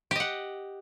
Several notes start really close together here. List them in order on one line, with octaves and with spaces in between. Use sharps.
G4 D#5 F#5